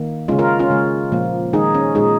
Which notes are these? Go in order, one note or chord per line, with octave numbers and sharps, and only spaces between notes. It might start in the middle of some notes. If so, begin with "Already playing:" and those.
Already playing: D#3 A#3
C#3 G#3 C#4 F4
F4 A#4
C#4 F4
C#3 G#3
A#2 F3 A#3
D#3 G#3 D#4 G#4
C#4
A#2 G#3 D#4 G#4